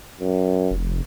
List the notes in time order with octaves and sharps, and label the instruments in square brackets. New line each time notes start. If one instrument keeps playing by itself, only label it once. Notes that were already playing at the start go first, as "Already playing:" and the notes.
[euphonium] F#2
[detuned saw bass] F1